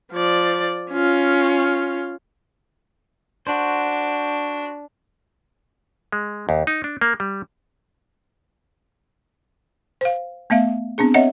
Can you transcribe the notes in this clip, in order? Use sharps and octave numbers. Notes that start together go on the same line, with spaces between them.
F3 D5
C#4 F4
D4 F#4 C5
G#3
D#2
D#4
D4
A#3
G3
C5 F5
A3 B3 E5 F5
B3 C4 D4 G#4
C4 C#5 D#5 E5 F#5